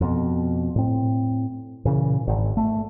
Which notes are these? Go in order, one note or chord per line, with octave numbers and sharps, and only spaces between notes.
F2 B2
A2 C4
A#2 C#3 E3
G#1
A3